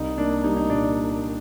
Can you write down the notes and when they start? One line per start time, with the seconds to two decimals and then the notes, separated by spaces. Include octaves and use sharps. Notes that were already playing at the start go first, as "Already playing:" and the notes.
Already playing: C2 D#4
0.18 A#3 D4
0.44 G3 D#4
0.57 D#4
0.70 A#2 D4